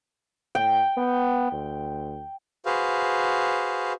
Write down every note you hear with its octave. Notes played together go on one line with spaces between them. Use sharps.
A2 G5
B3
D2
F#4 G#4 B4 C5 F5